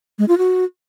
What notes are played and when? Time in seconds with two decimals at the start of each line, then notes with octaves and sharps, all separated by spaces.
0.19 G#3
0.28 F4
0.38 F#4